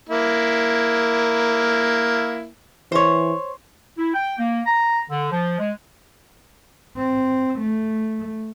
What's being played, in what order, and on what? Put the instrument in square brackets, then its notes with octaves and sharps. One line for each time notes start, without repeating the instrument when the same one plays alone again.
[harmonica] A#3 E4
[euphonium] E3 [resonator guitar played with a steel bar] C5 C#5
[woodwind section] E4
G5
A#3
A#5
D3
F3
G#3
[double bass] C4
A3